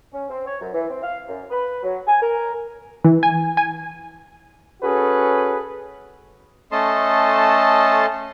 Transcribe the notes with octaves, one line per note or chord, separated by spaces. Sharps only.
C#4
C4
C#5
F#2
E3
C4
F5
F#2
B4
F#3
G#5
A#4
E3
G#5
G#5
C#4 F#4 G#4 A4 B4
A3 C#4 A4 D#5 A5 C6